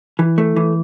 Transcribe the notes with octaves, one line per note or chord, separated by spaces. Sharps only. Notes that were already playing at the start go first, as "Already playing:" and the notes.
E3
A3
E3